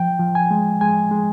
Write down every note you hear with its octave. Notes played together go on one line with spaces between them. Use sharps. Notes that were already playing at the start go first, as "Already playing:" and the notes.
Already playing: F3 G5
F3
G#5
G#3
G#3 G#5
G#3